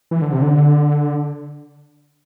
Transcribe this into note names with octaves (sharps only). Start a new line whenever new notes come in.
E3
D3
C3
D3